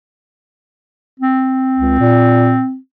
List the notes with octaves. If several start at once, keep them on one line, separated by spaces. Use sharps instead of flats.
C4
C#2
A#2